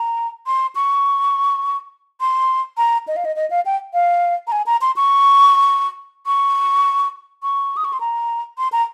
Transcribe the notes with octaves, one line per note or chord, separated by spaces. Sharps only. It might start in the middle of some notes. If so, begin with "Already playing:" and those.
Already playing: A#5
C6
C#6
C6
A#5
D#5
F5
D#5
D#5
F5
G5
F5
A#5
G#5
A#5
C6
C#6
C#6
C#6
D#6
C#6
C6
A#5
C6
A#5